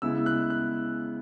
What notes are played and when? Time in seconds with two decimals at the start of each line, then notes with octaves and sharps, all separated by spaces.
0.02 C#3 G#3 B3 E4 E6
0.26 F#6
0.50 F#6